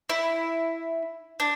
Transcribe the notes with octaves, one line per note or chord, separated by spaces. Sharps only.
E4
D4